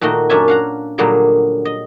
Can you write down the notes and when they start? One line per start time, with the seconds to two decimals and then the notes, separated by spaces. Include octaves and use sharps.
0.01 A#2 D#3 A3 F#4 D#5
0.30 F#2 C#4 D4 C#5 E5 G#5
0.48 F5 F#5 A#5
0.98 A#2 D3 F#3 G3 G#4 A#5
1.65 D#5